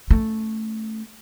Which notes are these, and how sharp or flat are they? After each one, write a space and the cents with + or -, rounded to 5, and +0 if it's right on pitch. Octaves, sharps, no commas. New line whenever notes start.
A3 +0 C#4 +0